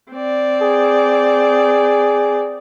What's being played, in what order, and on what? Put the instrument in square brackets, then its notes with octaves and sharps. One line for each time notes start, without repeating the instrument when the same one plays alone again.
[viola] C4 D5
[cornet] G#4